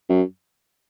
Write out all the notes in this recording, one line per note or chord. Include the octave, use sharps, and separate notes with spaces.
F#2